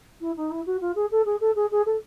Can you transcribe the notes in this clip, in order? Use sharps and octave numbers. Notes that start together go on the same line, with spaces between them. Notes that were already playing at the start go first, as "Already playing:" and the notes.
E4
D#4
E4
F#4
F4
G#4
A4
G#4
A4
G#4
G#4
A4